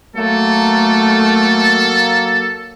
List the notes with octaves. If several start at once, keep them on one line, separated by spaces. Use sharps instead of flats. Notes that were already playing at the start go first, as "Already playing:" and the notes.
F#3 A3 A#3 A4